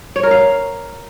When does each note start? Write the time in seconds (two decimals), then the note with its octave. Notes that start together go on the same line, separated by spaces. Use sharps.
0.16 C#5
0.23 A#4
0.31 F5